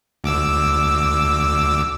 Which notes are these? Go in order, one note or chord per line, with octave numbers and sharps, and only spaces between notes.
D2 D6 E6